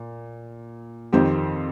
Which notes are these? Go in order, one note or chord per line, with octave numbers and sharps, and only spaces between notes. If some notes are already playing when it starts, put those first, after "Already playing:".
Already playing: A#2
F2 D#3 C4 G4